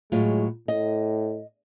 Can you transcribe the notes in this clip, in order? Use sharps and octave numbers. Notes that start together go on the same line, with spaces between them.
A2 F#3 G#3 F4
A2 D#5